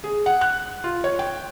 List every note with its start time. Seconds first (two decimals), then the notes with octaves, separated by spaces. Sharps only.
0.04 G#4
0.26 F#5
0.41 F#6
0.84 F4
1.04 C#5
1.19 G5